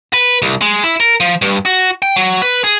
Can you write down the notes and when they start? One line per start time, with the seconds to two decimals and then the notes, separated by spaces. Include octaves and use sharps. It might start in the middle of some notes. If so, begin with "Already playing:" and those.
0.14 B4
0.42 C2
0.61 G#3
0.84 E4
1.00 A#4
1.20 F3
1.42 G2
1.65 F#4
2.02 G5
2.16 F#3
2.42 B4
2.64 G#4